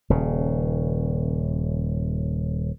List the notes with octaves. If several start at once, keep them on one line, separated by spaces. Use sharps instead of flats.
D#1 C#3